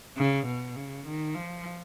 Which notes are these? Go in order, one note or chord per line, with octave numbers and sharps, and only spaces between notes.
C#3
B2
C#3
D#3
F3